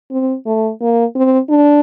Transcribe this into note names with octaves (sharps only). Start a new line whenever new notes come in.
C4
A3
A#3
C4
D4